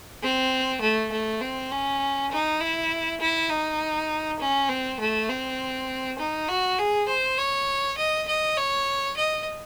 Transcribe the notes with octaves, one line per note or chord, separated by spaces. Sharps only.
C4
A3
A3
C4
C#4
D#4
E4
E4
D#4
C#4
C4
A3
C4
D#4
F#4
G#4
C5
C#5
D#5
D#5
C#5
D#5